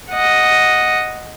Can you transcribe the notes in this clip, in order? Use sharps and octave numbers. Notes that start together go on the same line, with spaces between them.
D#5 F#5